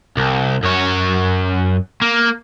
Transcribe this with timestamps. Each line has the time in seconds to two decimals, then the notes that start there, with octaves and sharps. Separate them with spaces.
0.17 C2
0.63 F#2 C#5
2.02 A#3